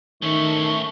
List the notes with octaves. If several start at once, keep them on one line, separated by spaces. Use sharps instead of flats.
D#3 A3 C#4 E5 A5 C#6